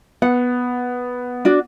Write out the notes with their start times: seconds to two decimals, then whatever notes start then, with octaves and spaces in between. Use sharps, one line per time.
0.22 B3 F#5
1.45 D4 F#4 D5